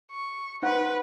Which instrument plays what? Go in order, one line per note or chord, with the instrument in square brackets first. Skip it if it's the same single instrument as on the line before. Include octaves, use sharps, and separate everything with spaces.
[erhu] C#6
[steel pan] D#4 C5 F#5 [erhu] B4